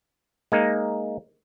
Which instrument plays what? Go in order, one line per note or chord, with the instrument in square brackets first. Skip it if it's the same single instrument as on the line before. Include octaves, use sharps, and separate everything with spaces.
[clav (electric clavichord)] G#3 A#3 D#4